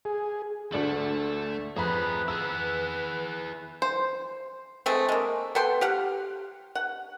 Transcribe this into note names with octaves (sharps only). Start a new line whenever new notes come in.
G#4
D2 A3 D4 F#7
F2 G#4 B4 E5 A#5 B5
E4 G#4 E6
C5
G#3 A3 C4
G#3 A#3
B3 A4 G5 C6
G4 F5 F#5
F#5